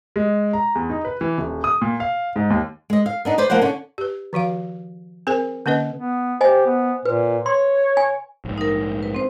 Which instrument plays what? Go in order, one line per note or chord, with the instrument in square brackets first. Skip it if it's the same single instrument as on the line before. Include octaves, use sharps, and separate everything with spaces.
[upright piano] G#3
A#5
E2
D#4
B4
E3
D#1
D#6
A#2
F5
G#2
D#2
[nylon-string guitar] G#3 D#5
F5
B3 D4 D#4
B4 C5 D5
F3 A#3 B4 C5 F#5
D3 C#4
[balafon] G4 B4
D#3 F3 F#4 F5
C4 G#4 A#4 C5 G#5
D3 A#3 C#4 B4 D#5
[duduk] B3
[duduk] G4 [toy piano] C5 D#5 G#5
[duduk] B3
[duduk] A#2 [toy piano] B4
[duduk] C#5 [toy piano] C6
[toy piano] G#5
[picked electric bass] A#1 G#2
[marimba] D#4 A#4
B4
C4 C5